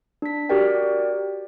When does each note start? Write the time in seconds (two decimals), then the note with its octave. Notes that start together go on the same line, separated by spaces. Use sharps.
0.22 D4 B6
0.49 F#4 G4 A#4 D5 G5